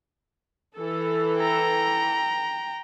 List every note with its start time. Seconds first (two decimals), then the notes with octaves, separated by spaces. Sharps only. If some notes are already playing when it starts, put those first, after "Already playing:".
0.77 E3 A4
1.39 G5 A#5